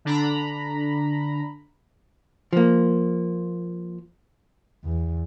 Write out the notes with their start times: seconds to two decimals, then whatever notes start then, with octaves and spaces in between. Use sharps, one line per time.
0.05 D3 D4 A#5 B5
2.53 F3 A#3
4.84 E2